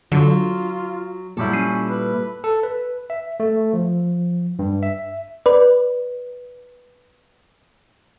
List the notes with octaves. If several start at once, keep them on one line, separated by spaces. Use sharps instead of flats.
D3 F#3 F4
A#2 F#3 G3 E4 A4
C#4 C7 D#7
B4
A4
B4
E5
A3
F3
G2
E5
B4 D5